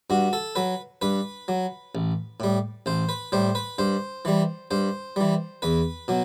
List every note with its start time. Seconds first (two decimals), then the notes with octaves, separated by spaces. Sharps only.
0.10 G2 F#4
0.33 A4
0.56 F#3 B4
1.02 G2 B4
1.48 F#3
1.95 A1
2.40 A2 G3
2.86 A1 C5
3.09 B4
3.32 A2 G3 C5
3.55 B4
3.78 G2 C5
4.25 E3 G3
4.71 G2 C5
5.16 E3 G3
5.62 E2 B4
6.08 B2 F#3